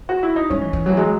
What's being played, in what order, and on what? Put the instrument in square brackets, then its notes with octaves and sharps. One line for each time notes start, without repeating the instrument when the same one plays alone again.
[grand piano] F#4
E4
D#4
[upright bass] G#3 [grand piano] C#4
[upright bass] E3
E3
[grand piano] E3 [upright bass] F#3
[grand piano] F#3 [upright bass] G#3